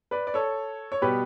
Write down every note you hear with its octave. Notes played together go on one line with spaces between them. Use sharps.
B4 D5
D5
A4 C#5
C#5
B2 G3 B3 G4 B4